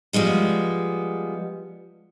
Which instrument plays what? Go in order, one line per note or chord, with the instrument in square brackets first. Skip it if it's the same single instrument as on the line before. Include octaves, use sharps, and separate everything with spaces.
[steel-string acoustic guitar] F3 G3 G#3 B3